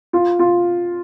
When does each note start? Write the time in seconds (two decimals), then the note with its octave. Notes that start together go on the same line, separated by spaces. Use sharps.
0.13 F4
0.39 F4